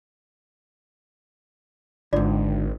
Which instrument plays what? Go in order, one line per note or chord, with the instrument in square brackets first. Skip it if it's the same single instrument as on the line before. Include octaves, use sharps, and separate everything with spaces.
[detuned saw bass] G#1 [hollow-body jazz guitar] G#2 D3 [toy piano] F4 D5